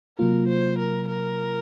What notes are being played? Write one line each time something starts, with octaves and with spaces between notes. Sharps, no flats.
C3 F#3 A#3 F4 A#4
C5
A#4
A#4